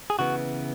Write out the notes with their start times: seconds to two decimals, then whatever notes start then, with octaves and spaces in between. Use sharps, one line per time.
0.10 G#4
0.19 C#3 E3 B3 F#4